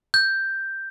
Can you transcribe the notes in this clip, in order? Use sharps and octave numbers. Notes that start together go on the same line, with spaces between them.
G6